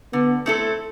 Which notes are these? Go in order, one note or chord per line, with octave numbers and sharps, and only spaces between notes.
D3 B3
A3 C4 E4 A4